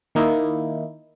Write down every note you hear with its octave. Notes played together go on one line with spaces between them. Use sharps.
D#3 A#3 D#4 E4